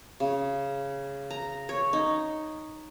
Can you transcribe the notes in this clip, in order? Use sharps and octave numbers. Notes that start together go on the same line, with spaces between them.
C#3
A#5
C#5
D#4